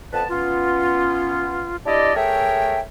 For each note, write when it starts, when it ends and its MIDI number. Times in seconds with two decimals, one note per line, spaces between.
0.13 0.23 41
0.13 0.23 59
0.13 0.23 71
0.13 0.23 81
0.29 1.77 59
0.29 1.77 61
0.29 1.77 65
1.86 2.14 62
1.86 2.14 64
1.86 2.14 67
1.86 2.14 74
1.86 2.14 75
2.15 2.80 57
2.15 2.80 68
2.15 2.80 70
2.15 2.80 73
2.15 2.80 76
2.15 2.80 79